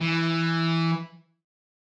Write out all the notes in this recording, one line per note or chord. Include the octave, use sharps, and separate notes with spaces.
E3